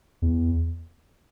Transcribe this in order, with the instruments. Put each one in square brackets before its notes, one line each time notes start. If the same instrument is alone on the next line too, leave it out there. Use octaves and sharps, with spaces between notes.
[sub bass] E2